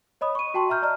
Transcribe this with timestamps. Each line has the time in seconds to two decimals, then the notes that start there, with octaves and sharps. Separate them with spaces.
0.21 C#5 D#5 B5 D#6
0.35 C#6 D#7
0.54 F#4 G5 A5 C6 C#6
0.70 E5 A#5 F6 G6
0.82 D5 D#5 A#5 F6